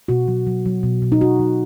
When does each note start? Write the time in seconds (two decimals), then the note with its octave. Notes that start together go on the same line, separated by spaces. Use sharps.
0.08 B2 F#4
0.28 F#3
0.47 F#3
0.66 F#3
0.83 B2
1.02 B2
1.12 D#4
1.21 B2 F#4
1.39 F#3